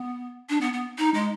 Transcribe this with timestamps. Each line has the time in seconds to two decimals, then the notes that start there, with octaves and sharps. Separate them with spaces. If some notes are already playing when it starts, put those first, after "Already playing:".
Already playing: B3
0.50 D4
0.61 B3
0.73 B3
0.98 D#4
1.14 G#3